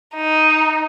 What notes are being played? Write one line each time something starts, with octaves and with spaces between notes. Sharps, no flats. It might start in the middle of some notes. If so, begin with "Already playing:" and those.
D#4